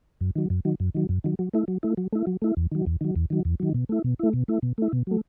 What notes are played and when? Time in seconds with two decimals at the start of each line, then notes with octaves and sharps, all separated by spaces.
0.21 F#2
0.35 D#3 F#3
0.50 F#2
0.65 D#3 F#3
0.80 F#2
0.95 D#3 F#3
1.09 F#2
1.24 D#3 F#3
1.39 F#3
1.54 A3 E4
1.68 F#3
1.83 A3 E4
1.97 F#3
2.13 A3 E4
2.27 F#3
2.42 A3 E4
2.57 E2
2.72 D#3 F#3
2.86 E2
3.01 D#3 F#3
3.16 E2
3.30 D#3 F#3
3.45 E2
3.60 D#3 F#3
3.74 B2
3.89 A3 E4
4.04 B2
4.19 A3 E4
4.33 B2
4.48 A3 E4
4.63 B2
4.78 A3 E4
4.93 B2
5.07 F#3 A3